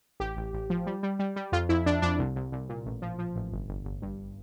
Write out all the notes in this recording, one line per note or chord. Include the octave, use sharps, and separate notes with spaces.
A1 G4
A1
A1
F3
G3
G3
G3
G3
F2 F4
F2 E4
F2 D4
F2 D4
C2
C2
C2
A#2
A1
F3
F3
A1
G1
G1
G1
G2